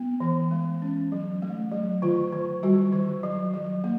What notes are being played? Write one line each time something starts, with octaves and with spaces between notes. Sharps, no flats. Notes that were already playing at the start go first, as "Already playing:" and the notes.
Already playing: B3
E3
G#3
C#4
F#3
A3
F#3
D#3 F4
D#3
G3 F#4
D#3
F#3
F#3
A#3